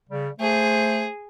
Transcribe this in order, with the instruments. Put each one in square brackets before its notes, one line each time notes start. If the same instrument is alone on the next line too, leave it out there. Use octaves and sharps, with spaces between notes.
[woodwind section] C#3 G3
[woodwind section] A3 C5 [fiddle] G#4